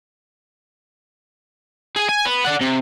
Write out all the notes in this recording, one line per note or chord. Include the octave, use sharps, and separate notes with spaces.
G#4 G#5
G#5
B3
D5 F#5
C3